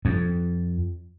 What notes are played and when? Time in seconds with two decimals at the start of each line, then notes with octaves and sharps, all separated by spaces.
0.05 F2